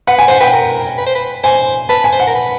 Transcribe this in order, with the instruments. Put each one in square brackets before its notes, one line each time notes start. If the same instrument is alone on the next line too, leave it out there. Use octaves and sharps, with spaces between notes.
[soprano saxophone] B4 [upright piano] F#5
[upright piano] G#5
[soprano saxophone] C5 [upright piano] F#5
[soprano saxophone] B4 [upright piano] G5
[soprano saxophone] A#4
B4
C5
B4
[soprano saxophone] C5 [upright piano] G#5
[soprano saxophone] B4 [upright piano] A5
[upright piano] G#5
[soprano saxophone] C5
[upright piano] F#5
[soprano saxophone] A#4
B4